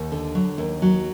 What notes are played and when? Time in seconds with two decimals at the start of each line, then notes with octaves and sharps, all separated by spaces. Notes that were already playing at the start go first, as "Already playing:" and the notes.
Already playing: D#2
0.12 D3
0.35 F#3
0.58 D#2
0.82 F#3